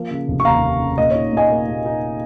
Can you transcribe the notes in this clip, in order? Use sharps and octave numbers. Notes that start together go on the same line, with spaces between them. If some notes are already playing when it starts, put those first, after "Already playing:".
Already playing: F3 A#3
C#3
F1
C#6
D#2 F5 A#5
A#3
C#3
A#2 D#5
D#4 C#5
A#2 D#5 G#5
A#3
A#2
D#4